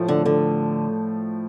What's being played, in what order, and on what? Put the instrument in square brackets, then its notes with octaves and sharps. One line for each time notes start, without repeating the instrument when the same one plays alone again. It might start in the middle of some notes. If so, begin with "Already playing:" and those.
Already playing: [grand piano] A2 F3 A3
[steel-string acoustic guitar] D3
D3